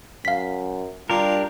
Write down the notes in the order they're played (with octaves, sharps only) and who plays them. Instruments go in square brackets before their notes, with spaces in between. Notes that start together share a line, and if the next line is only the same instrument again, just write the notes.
[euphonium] F#2 [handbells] F5 B6
[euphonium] G3 [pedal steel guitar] D4 G4 A#4 [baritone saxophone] F4